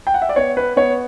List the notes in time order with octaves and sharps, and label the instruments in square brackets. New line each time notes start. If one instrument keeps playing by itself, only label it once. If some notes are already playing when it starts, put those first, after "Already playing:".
[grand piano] G5
F#5
E5
D5
B3 C#5
B4
B3 C#5